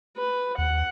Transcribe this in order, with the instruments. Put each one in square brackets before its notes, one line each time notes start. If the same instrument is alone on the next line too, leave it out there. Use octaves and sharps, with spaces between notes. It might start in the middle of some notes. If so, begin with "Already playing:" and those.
[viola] B4
[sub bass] D#2 [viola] F#5